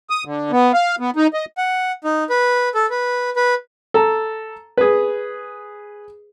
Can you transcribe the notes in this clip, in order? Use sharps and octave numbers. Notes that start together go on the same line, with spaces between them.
D#6
D3
B3
F5
B3
D#4
D#5
F#5
D#4
B4
A4
B4
B4
A4 A#5
G#4 B4